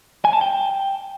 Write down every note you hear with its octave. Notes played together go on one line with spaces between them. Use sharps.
G#5
A5
G5